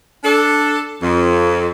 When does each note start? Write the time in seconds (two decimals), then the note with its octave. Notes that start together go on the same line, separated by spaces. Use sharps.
0.24 D4 A4
1.02 F2